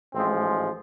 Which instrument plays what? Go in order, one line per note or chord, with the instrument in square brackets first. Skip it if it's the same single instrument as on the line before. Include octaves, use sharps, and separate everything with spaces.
[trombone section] A1 G#2 F3 G#3 C4